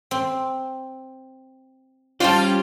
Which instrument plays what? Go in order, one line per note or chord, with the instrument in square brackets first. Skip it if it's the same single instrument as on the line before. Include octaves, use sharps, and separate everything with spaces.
[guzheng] C4
[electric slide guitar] G3 C#4 G4 [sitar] F4 [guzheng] C5 G5 A5